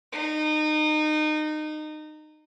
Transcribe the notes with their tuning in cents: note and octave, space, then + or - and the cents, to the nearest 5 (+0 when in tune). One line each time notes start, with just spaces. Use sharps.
D#4 -25